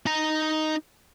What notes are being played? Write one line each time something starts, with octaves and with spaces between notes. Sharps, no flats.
D#4 A#5